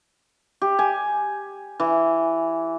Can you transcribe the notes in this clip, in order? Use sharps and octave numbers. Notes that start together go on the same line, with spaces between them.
G4
G#5
E3